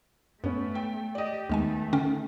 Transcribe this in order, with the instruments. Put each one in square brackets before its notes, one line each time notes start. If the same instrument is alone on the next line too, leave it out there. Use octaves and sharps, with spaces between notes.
[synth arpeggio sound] F#2 [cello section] A3 [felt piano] B3 C#4
[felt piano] G5
[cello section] G4 [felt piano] D5 D#5
[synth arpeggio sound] D#2 G#3 G#5 [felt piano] D#3 B3 [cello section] A3
[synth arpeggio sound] D3 C#4 G5